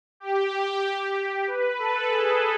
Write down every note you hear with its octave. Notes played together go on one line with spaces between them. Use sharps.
G4
B4
A4
G#4